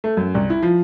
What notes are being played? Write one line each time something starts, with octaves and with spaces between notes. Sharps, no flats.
A3
F#2
C2
E4
F3